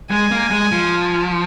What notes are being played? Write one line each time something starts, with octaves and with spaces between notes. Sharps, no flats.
G#3 G#5
A#3
G#3
F3